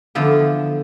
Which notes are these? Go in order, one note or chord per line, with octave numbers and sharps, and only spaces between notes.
D3 E3 F3 B3